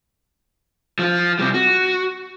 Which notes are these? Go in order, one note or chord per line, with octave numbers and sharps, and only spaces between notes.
F3 F4
C3 G3
F#4